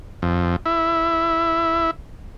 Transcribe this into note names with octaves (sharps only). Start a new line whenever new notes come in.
F2
E4